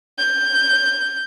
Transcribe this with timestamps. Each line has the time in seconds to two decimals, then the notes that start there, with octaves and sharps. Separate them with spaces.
0.18 G6